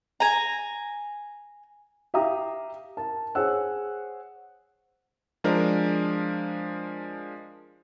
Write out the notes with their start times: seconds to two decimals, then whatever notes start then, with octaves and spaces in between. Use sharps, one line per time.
0.20 G#5 A#5
2.14 G4 E5 F5 A#5 D#6
2.97 A#4 A5
3.35 G#4 C5 C#5 F#5 E6 F#6
5.44 F3 G#3 D4 A#4